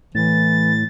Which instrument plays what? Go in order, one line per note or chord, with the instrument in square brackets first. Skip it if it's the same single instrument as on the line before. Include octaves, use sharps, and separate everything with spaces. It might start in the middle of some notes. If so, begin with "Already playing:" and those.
[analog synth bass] A2 [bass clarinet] E3 [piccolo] A6